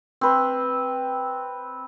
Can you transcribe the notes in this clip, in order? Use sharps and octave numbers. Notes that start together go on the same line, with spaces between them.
C4 B4